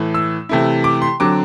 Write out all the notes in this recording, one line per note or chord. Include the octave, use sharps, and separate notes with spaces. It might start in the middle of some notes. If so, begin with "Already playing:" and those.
Already playing: A2 E3 A3
E6
C3 E3 A3 E4
D6
C6
D3 F#3 C4 D6